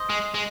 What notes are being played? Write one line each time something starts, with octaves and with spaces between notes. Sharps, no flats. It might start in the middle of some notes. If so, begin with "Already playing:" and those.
Already playing: C5 D#5
G#3
G#3